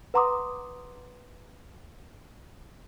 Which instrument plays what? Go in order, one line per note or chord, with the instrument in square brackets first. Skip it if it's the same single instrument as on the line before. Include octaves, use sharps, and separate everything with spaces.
[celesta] B4 F#5 A#5 C6 D6 D#6